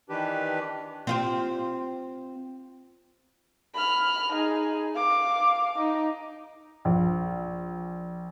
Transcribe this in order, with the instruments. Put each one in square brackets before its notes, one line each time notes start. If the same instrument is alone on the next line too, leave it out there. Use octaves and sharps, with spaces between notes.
[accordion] D#3 E3 D4 G4 B4
[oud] C4 F4 G4
[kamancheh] B5 F6
D#4 G#4
F5 D6
D#4
[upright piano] A#1